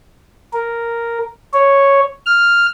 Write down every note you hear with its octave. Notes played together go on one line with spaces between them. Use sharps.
A#4
C#5
F6